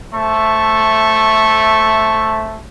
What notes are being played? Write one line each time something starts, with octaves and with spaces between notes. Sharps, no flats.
A3 C5 E5 A5 C#6